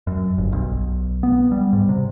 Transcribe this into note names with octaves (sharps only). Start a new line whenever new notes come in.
F#2
G1
B1
B3
G3
G#2
C3